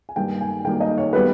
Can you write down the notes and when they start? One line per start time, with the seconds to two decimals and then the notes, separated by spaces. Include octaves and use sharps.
0.09 G#5
0.16 G2 D#3 A#3 G5
0.41 G#5
0.65 G2 D#3 A#3 G5
0.80 D#5
0.98 C#5
1.13 G3 B3 B4